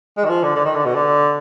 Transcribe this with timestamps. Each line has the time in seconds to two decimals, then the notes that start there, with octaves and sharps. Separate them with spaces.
0.17 G#3
0.25 D#3
0.29 F3
0.43 D3
0.56 D3
0.65 D#3
0.75 D3
0.85 B2
0.95 D3